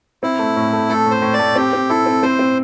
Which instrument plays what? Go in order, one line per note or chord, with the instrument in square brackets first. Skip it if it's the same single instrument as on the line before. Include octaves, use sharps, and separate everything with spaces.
[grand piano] C4 [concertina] E4
[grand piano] A3
A2
A3
[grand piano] A3 [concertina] A4
[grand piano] A2 [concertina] C5
[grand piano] A2
[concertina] D5
[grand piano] A3
[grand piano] C4 [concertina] G4
[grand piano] C4
[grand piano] E4 [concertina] A4
[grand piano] C4
[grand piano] C4 [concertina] C5
[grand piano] C4